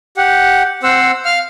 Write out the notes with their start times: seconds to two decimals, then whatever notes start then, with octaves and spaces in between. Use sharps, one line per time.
0.17 G4 F#5
0.83 C4 C5 F#5 E6
1.25 F5 F6